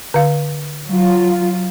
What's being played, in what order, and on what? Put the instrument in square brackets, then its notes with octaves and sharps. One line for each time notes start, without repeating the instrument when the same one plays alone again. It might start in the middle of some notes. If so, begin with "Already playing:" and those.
[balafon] D3 F5
[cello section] F#3 F4